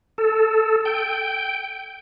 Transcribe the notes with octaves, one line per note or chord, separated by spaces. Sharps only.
A4
G5